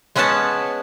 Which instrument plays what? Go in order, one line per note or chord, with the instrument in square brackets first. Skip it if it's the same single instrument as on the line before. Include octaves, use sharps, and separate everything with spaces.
[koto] G#3 B3 C#4 B4 F#5 A5